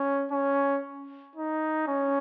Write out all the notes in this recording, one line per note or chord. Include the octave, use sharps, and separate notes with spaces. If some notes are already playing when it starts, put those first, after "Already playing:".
Already playing: C#4
C#4
D#4
C#4